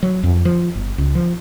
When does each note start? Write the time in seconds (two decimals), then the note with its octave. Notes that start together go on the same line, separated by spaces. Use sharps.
0.03 F#3
0.23 F2
0.45 F3
0.75 G1
0.98 C#2
1.15 F3